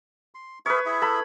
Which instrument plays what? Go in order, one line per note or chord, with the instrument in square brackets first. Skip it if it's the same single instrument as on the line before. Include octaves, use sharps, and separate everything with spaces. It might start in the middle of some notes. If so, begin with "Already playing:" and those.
[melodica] C6
[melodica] G#4 A#4 E5 [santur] B4 C#5
[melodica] E4 G#4 E5
[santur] A4 B5